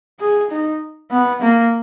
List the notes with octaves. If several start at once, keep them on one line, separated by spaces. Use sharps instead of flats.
G#4
D#4
B3
A#3